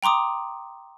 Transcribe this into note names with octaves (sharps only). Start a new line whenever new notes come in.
G5 A#5 C6 D6 D#6